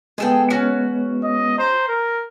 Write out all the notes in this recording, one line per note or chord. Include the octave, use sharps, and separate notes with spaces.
G#3 B3 G#4 A4 G5
C#4 F#4
D#5
C5 A#5
A#4